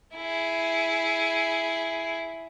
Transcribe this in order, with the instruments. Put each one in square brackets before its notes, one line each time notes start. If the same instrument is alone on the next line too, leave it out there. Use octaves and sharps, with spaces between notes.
[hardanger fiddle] E4 G#4